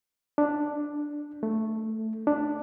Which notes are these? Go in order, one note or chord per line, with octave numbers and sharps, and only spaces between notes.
D4
A3
D4